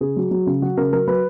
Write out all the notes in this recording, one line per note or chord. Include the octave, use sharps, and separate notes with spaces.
C#3 G#4
F#3
F#3
C#3
F#3 F#4
C#3 A#4
F#3 A#4
F#3 B4